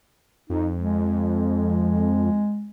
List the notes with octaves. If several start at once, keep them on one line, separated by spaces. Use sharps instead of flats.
F2 D#4
G#3